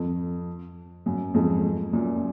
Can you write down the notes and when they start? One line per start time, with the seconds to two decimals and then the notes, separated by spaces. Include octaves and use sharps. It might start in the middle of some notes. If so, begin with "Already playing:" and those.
Already playing: F2
1.06 F#2
1.34 F2 G#2
1.93 F#2 A#2